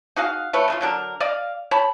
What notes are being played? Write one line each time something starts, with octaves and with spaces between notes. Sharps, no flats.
D#4 F#4 G#4 F5
A3 B4 C#5
C#3 A3 F4
D3 F#3 D4 A#4
D5 D#5 F5
C#5 A5 B5